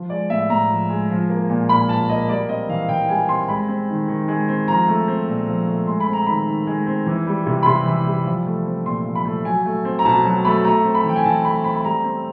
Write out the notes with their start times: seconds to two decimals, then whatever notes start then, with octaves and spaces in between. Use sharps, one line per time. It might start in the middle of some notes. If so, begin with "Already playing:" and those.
Already playing: F3
0.10 G#3 D5
0.30 A2 E5
0.50 A2 A#5
0.70 F3
0.89 G#3
1.10 F3
1.30 A#3
1.49 A#2
1.69 A#2 B5
1.89 F3 A5
2.09 A#3 D#5
2.29 G3 D5
2.49 C4 D#5
2.68 E3 F5
2.89 E3 G5
3.09 G3 G#5
3.29 C4 C6
3.48 G#3 B5
3.68 C4
3.89 D#3
4.08 D#3
4.28 G#3
4.48 C4
4.68 F3 A#5
4.88 A3
5.08 C4
5.28 A#2
5.48 F3
5.67 A3
5.87 G#3 C6
6.00 B5
6.07 C4
6.13 A#5
6.27 D#3 B5
6.46 D#3
6.67 G#3
6.87 C4
7.06 E3
7.26 G3
7.46 C3
7.63 B5
7.66 C3 C6
7.86 E3
8.06 G3
8.26 F3
8.46 A3
8.66 C4
8.86 A#2 C6
9.05 F3
9.15 B5
9.25 A3
9.45 F#3 G#5
9.65 A3
9.85 C4
9.99 A#5
10.05 B2 A5
10.24 F#3
10.45 A3 B5
10.64 A3 A#5
10.84 C4
10.95 B5
11.04 E3 G5
11.16 G#5
11.24 E3 A5
11.44 A3 B5
11.64 C4 B5
11.75 B5
11.84 G3 A#5
12.04 C4